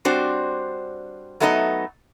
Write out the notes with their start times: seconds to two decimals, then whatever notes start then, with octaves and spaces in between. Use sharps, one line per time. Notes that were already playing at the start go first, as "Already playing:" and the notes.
0.05 G3 C4 D4 F#4 C5
1.40 F#3 A3 B3 D#4 B4 D#5